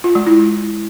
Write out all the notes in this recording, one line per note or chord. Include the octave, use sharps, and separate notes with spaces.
F4
G#3
E4